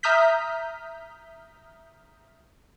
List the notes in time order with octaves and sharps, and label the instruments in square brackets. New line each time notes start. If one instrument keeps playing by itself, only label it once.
[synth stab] E5 A#5 D#6 F6 G6 B6